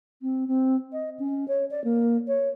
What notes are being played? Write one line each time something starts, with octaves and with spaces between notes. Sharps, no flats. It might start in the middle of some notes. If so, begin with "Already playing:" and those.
C4
C4
D#5
C#4
C#5
D5
A#3
C#5